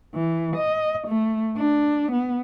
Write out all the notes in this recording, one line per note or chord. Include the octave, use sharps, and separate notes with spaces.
E3
D#5
A3
D4
B3